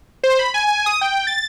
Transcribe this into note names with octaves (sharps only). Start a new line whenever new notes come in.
C5
B5
G#5
G#5
D#6
G5
A6